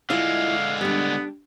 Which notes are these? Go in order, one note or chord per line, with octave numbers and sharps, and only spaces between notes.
D3 G#3 E4 F4 D#5 F5
G3 B3 D4